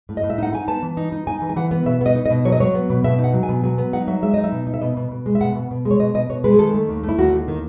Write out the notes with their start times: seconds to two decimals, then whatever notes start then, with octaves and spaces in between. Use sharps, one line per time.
0.09 A2
0.17 D#5
0.23 A2
0.30 E5
0.38 D#4 F#5
0.53 D#4 G#5
0.68 B3 A5
0.82 E3
0.97 D#4
1.12 D#4
1.27 D#4 G#5
1.42 E3
1.49 G#5
1.56 E3 F#5
1.71 B3
1.86 B2 E5
2.01 B3 D#5
2.15 D#4
2.26 D#5
2.30 B2
2.45 F#3 C#5
2.52 D#5
2.60 F#3 C#5
2.74 B3
2.90 B2
3.04 B2 E5
3.19 D#4
3.24 F#5
3.34 F#3
3.43 G#5
3.49 B2
3.64 F#3 G#5
3.78 B3
3.93 D#4 F#5
4.07 F#3 E5
4.22 G#3 E5
4.34 D#4 D#5
4.44 E5
4.52 B2
4.67 D#4
4.74 E5
4.82 B2 D#5
4.97 B2
5.11 B2
5.26 G#3
5.35 E5
5.41 B2 F#5
5.55 B2
5.71 B2
5.85 G#3
5.91 C#5
5.99 B2 D#5
6.14 B2 D#5
6.29 B2 C#5
6.44 G#3 B4
6.54 G#4
6.59 D#3 A4
6.74 A3
6.89 D#2
7.03 A3
7.09 E4
7.18 D#2 F#4
7.33 D#2
7.48 D#3